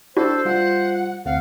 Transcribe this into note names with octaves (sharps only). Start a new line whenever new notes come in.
D4 E4 F#4 G4 A4 C5
G3 F4 F#5
D2 A3 C4 F5 F#5